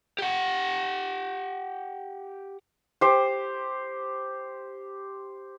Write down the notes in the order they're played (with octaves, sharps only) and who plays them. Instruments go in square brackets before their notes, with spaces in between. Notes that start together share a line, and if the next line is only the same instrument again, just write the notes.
[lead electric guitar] G4 F#5
[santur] G4 C5